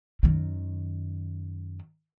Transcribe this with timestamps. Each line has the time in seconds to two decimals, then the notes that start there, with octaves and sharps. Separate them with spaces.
0.23 F#2 D#3